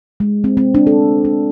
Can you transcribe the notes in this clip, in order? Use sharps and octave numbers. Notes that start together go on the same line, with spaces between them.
G#3
C4
C4
D4
A4
D4